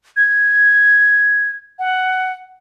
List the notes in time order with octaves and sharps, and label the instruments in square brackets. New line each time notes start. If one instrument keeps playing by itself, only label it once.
[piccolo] G#6
F#5